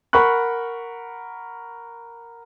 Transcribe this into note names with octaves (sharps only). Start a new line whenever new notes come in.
A#4 F#5 B5 C#6 F#6